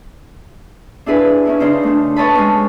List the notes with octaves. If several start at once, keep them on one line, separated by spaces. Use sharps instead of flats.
D4 E4 G#4 B4 B5
C#4 D#4 E4
C#3 D4 D#4 C5
A3 D4
B4 C#5 D#5 A5 B5
G#3 C#4